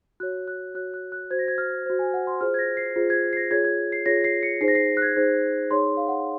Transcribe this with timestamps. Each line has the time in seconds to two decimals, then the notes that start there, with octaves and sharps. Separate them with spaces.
0.20 F#4 C#5 F#6
0.48 F#6
0.75 F#4 C#5 F#6
0.94 F#6
1.12 F#6
1.30 F#4 C5 G#6
1.39 A#6
1.48 G#6
1.58 F6
1.86 F#4 C5
1.99 G#5
2.14 F#5
2.27 C6
2.41 F4 G#4 C5 F6
2.54 G#6
2.59 A#6
2.77 C7
2.96 F4 G#4 C5
3.10 G#6
3.33 C7
3.37 A#6
3.51 F4 G#4 C#5 G#6
3.65 G#6
3.92 C7
4.06 F4 G#4 C#5 A#6
4.24 C7
4.43 C#7
4.61 D#4 G#4 C5 C7
4.68 A#6
4.75 C7
4.97 F#6
5.02 G#6
5.16 D#4 G#4 C5
5.71 D#4 G#4 C#5 C6
5.97 F5
6.08 F#5